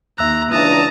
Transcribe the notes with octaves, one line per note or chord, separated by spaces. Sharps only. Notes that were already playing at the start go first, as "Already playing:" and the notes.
D#2 E5 A#5 E6 F#6
C#2 E3 D4 A5 A#5 D#6